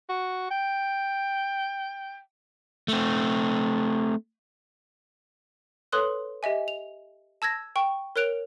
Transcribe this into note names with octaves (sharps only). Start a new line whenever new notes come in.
F#4
G5
A3 C4
A4 B4 C#5 C6 D#6 F#6
G4 D#5 E5 G#5
F7
A5 E6 G#6 A#6
G5 C#6
A#4 C#5 F#6 D7 F7